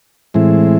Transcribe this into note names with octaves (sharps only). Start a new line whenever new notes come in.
A2 E3 G#3 C4 E4